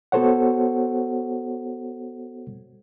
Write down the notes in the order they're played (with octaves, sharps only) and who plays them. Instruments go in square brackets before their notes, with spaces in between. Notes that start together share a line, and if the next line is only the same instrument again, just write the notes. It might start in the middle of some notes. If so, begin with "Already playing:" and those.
[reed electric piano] B3 F#4 A4 C5 C#5 F#5